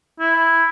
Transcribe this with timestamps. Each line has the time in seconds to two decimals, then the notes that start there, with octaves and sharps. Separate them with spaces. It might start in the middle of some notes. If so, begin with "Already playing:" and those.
0.20 E4